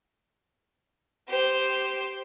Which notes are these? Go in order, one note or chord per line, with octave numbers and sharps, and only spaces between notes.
G4 C5